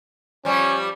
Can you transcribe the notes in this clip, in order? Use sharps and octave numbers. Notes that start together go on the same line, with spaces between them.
F3 G3 C#4